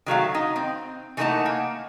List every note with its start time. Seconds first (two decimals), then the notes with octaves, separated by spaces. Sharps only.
0.06 D#3 F#3 A3 F5
0.34 D#4
0.56 C4
1.17 E3 A3 A#3 D#4 F#5 A5
1.46 A#3